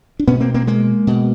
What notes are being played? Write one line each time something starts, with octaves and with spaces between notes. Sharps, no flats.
D4
B2 B3 C#4
A#3 C4
A#3 C4
G#3 A#3
B2